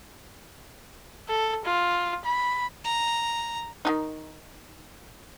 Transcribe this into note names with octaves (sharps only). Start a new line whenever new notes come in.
A4
F4
B5
A#5
D#3 D4 D#4